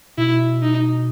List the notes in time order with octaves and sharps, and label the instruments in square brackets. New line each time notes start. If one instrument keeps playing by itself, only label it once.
[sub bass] B2 [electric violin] E4
[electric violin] D#4